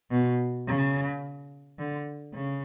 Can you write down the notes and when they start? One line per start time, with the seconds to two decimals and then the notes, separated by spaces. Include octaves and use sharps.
0.11 B2
0.68 C#3
1.79 D3
2.35 C#3